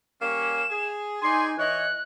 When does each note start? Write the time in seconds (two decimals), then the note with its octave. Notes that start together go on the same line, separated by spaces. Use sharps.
0.22 G3 A#3 C#4 E7
0.69 G#4
1.22 D#4 G#4 D5 G#5 C6
1.58 E3 C#5 D#5 F#6